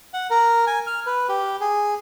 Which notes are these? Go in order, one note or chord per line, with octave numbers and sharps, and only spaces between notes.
F#5
A#4
G#5
F6
B4
G4
G#4